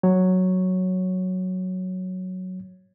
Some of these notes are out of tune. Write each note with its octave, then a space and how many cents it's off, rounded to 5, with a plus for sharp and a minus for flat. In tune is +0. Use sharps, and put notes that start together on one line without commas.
F#3 +0 C#5 +0